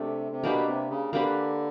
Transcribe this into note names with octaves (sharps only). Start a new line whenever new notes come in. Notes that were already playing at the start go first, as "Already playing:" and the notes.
Already playing: C3 A3 D4 G4
C3
B2 A#3 D4 G4 B4
C3
C#3
D3 A#3 D4 G4 B4